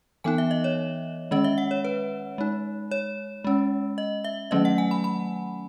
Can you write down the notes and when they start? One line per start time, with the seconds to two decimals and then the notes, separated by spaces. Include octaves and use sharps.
0.24 E3 B3 D#4 G#5
0.38 E5
0.51 D#5
0.64 C#5
1.31 D#3 G#3 C#4 D#5
1.44 E5
1.58 F#5
1.71 C#5
1.85 B4
2.38 G#3 D#4
2.91 C#5
3.44 G#3 C#4
3.98 D#5
4.25 E5
4.51 D#3 F#3 A3 C#4 D#5
4.65 F#5
4.78 G#5
4.91 B5
5.04 B5